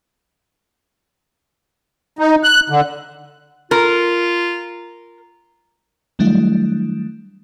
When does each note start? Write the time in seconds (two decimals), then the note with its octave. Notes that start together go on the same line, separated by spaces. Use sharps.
2.19 D#4
2.43 F#6
2.70 D3
3.71 F4 A#4
6.19 D#3 F#3 G3 A3 D4 E4